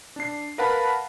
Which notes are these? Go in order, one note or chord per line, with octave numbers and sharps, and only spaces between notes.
D4 C7
A#4 B4 F5 F#5 A5 B5